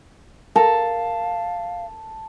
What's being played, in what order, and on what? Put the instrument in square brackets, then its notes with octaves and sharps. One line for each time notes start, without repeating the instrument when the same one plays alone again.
[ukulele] A4 A#4 [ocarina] F5 [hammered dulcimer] A5